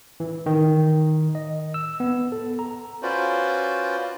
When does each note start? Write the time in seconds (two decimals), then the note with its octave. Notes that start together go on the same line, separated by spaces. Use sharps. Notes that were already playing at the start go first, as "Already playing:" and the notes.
0.20 E3
0.46 D#3
1.35 D#5
1.74 E6
2.00 B3
2.32 A4
2.59 A#5
3.02 C#4 F4 F#4 B4 C5 D5